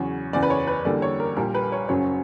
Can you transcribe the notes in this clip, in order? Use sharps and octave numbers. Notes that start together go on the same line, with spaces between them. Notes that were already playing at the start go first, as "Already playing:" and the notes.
Already playing: E2 C#3 F#3 C#5
F#1 E2 C#3 D5
B4
C#5
B4
E2 D3 G3 A#3 D5
C#5
A#4
A#1 A#2 G3 A#4
B4
C#5
F#1 F#2 C#3 F#3 C#5